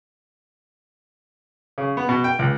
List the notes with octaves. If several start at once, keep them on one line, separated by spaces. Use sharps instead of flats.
C#3
B3
B2
G5
C#2